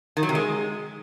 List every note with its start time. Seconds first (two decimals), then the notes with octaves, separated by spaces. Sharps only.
0.17 D#3
0.23 F#3
0.29 C3
0.35 G#3